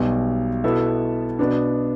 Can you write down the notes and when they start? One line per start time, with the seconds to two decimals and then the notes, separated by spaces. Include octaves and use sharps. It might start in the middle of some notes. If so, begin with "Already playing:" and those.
Already playing: B1 B2 G3
0.64 B2 B3 E4 A4 E5
1.39 B2 B3 D4